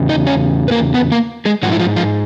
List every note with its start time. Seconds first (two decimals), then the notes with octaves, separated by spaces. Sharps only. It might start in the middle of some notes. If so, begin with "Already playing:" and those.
Already playing: E2 C#3
0.09 D#4 D#5
0.27 C#4 C#5
0.68 B4
0.71 A#3 A#4
0.94 B3 B4
1.12 A#3 A#4
1.45 G#3 G#4
1.63 G#2 F3 F#3 F#4
1.72 E4
1.79 F3 F4
1.96 F3 F4